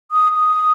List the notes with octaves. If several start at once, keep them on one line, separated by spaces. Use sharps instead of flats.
D#6
D#6